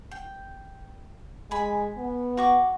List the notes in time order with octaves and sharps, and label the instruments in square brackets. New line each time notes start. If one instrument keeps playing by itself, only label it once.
[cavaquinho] G5
[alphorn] G#3 [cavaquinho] G#5 B5
[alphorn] B3
[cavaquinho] F#4 C#6 D6